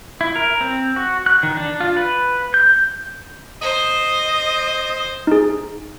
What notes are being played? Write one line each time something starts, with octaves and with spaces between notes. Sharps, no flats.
E4
A#4
C4
F#4
F#6
D#3
D4
F4
B4
G6
C5 D#5
D#4 G#4